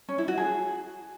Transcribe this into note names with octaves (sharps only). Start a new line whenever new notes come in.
C#4
E4
F#4
G#4